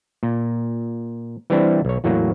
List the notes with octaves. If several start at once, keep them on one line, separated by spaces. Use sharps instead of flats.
A#2
E3 G3 C4 D4 E4
B1 C#5
E2 A2 F#3 A#3